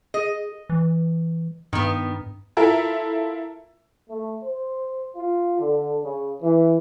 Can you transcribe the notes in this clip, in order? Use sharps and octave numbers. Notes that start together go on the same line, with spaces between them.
G#4 D#5
E3
G2 D#3 B3
E4 F4 A4 A#4 E5
A3
C5
F4
D3
C#3
E3